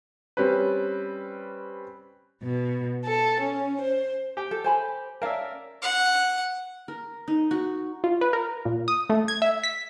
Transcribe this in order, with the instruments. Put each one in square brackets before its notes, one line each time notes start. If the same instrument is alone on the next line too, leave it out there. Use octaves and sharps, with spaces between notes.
[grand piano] G3 C4 C#4 B4
[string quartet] B2
A4
C#4
C5
[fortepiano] G4 G5
[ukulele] A4
C5 G#5 B5
[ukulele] C#4 F5 A5 [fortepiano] A#4 D5 E5
[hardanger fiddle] F#5
[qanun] A#4
D#4
F#4
[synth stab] F4
B4
A#4
A#2
D#6
A3
G#6
E5
B6